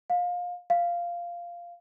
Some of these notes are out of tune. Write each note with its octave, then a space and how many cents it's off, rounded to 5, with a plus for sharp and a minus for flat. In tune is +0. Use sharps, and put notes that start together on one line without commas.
F5 +25
F5 -10